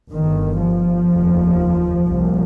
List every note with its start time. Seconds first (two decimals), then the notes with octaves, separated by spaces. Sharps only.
0.12 G1 G2 D#3
0.60 F3
1.09 F1 D#2
2.05 C2 A#2